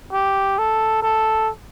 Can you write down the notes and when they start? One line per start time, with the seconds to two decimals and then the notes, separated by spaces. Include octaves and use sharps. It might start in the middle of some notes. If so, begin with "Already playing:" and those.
0.13 G4
0.58 A4
1.02 A4